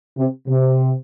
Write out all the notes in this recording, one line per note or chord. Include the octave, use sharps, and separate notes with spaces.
C3
C3